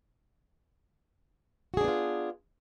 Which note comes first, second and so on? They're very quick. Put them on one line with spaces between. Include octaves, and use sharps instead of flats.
F#4 G#4 D4 B3 F4